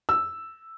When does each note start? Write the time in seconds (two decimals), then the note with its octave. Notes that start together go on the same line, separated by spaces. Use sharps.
0.09 E6